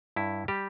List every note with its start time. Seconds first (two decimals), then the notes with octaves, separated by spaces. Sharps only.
0.16 G2 E4
0.48 G3 G4